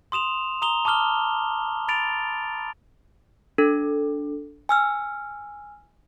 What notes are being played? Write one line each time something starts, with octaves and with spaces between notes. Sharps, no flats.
C6 D#6 E7 F7
A#5 D#6 F7 G7
A5 D6 D#6 F6 G7
B5 A6 D7 F7
D4 A4
G#5 E6 F6